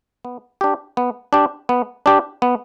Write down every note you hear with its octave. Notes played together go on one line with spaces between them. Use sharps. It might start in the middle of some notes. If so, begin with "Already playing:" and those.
B3
D4 G4
B3
D4 G4
B3
D4 G4
B3